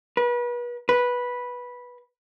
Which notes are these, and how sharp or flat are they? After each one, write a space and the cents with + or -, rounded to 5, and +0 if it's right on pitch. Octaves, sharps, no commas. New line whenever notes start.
B4 -35
B4 -10